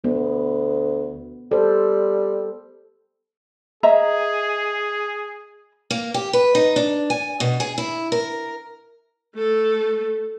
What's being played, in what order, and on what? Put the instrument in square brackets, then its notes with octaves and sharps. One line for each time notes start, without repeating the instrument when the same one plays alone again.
[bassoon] D2 [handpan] B3
[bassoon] G3 [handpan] A4 C5
[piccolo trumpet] G#4 [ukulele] D#5 E5 A#5
[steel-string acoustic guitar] A#3
G4
B4
D#4
D4
G#5
B2
G#4
E4
A#4
[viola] A3 A4